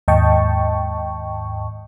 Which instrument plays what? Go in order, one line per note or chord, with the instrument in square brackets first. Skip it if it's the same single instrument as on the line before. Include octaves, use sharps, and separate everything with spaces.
[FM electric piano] D#2 G#2 D#5 G5 A5 C#6